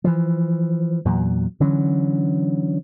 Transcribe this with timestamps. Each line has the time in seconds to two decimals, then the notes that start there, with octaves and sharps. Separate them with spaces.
0.04 E3 F3
1.05 E2 A#2 F#3
1.60 D3 E3 F#3 C#4